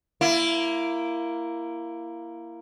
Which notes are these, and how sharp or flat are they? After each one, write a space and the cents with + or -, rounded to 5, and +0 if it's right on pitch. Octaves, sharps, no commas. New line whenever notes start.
A#3 +0 E4 +20